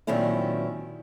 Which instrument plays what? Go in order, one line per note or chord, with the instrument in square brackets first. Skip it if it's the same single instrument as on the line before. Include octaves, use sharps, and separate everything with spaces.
[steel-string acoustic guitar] A#2 D#3 F#3 C4 C#4 E4